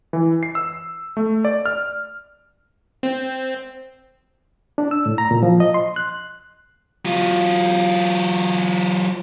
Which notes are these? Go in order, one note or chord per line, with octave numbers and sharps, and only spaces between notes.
E3
C7
E6
A3
D5
F6
C4
D4
E6
A2
A#5
A#2
F3
D#5
C6
F#6
F#3 F4